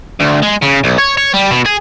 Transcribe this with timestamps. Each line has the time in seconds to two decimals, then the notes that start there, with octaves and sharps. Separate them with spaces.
0.20 D2
0.42 G#3
0.62 C#3
0.84 B1
0.98 C#5
1.18 C#5
1.34 G3
1.51 B2
1.66 G#4